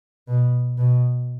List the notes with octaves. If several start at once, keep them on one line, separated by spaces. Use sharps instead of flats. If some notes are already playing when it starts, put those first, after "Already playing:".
B2
B2